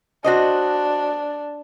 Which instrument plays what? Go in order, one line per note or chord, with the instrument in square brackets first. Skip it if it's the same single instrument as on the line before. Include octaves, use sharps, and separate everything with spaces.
[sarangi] D4 [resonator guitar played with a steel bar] F#4 C5 D#5